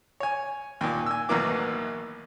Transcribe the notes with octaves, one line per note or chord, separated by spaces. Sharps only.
C#5 G#5
D#2 A#2
G#5 E6
A1 D#2 B2 F#3 A#3 D6